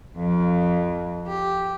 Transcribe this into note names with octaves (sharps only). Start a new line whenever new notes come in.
F2
G4